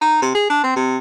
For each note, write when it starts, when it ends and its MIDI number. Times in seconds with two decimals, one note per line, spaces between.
0.01 0.21 63
0.22 0.31 48
0.34 0.47 68
0.50 0.59 62
0.63 0.74 60
0.76 0.97 48